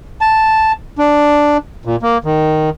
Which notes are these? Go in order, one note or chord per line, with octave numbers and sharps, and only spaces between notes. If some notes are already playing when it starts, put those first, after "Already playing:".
A5
D4
A#2
A#3
D#3